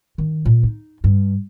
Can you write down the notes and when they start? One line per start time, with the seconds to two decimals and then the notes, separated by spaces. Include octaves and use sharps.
0.18 D#3
0.45 A#2
0.63 D#4
1.04 G2